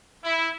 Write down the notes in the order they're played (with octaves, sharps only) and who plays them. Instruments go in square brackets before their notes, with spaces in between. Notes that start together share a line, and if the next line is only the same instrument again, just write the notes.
[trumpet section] E4